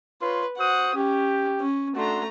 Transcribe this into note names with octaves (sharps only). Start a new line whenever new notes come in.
F4 B4 C#5 C6
F#4 C5 F#5 D#6
C#4 G4
C#4
A3 D4 F#4 A#5 C6